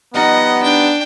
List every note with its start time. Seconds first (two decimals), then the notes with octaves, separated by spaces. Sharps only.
0.14 F3 G3 B3 D#4 D#5 F#5
0.63 D4 G5